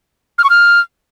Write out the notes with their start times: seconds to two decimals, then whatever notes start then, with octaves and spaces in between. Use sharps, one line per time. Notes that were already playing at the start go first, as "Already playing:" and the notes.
0.38 F6
0.44 C#6
0.50 F6